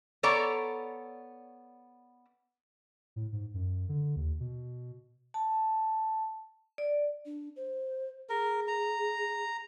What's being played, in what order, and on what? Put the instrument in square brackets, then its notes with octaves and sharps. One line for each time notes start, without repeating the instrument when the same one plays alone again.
[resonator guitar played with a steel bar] B3 A4 C#5 D5 A#5
[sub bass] A2
G#2
F#2
D3
D#2
B2
[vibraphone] A5
D5
[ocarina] D4
C5
[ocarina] G#4 [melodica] A#4
[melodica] A#5